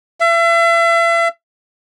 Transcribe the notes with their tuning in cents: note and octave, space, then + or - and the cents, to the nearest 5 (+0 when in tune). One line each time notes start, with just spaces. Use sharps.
E5 +40